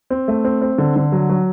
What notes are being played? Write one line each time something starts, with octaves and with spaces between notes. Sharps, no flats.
C4
A3
C4
C4
D3
D3
F#3
F#3